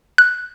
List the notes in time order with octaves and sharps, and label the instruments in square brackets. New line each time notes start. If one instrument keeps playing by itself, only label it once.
[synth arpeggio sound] F#6